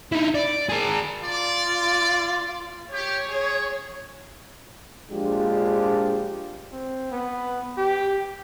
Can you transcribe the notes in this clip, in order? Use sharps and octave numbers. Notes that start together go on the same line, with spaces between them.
D#4 E4
D5
G#4 A#4
F4 D5
G4 C#5
G#4
A#1 F3 G#3 D4 F4 G4
C4
B3
G4